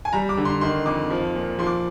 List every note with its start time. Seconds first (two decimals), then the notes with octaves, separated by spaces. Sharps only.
0.05 G#5
0.13 G3 A#5
0.29 D6
0.37 D3
0.45 C6
0.61 D#3 C6
0.86 F2 D6
1.10 F3
1.35 A#2
1.59 F3 C6
1.67 D6